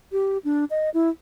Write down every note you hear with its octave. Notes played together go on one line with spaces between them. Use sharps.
G4
D4
D#5
E4